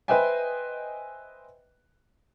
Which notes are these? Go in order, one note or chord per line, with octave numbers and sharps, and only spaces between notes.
B4 C5 D#5 E5 G5 G#5